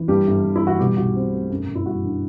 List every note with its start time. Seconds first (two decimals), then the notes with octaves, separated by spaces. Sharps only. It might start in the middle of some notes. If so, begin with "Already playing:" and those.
Already playing: E3
0.08 G2 G3 G4
0.27 G1
0.44 G1
0.56 E4
0.62 E3 F#4
0.79 B2 G3 G4
0.97 B1 F#4
1.16 C4
1.32 A3
1.51 F#2
1.68 G1
1.75 E4
1.86 G3 F#4
2.04 D3